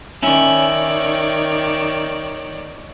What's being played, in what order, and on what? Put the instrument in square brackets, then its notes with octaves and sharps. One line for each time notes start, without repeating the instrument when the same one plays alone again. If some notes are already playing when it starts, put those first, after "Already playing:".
[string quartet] D#3 C#5 D5 [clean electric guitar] C#4 E4